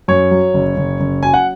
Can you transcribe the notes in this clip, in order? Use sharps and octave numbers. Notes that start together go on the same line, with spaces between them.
F#2 C#5
F#3
F#1
F#1
F#1
F#3 G#5
F#5